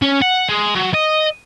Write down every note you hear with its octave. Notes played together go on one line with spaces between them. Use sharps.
C#4
F#5
G#3
F#3
D#5